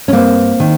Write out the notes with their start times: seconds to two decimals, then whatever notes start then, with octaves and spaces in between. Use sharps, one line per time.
0.08 C#4
0.13 G2 A#3 C4
0.60 D#3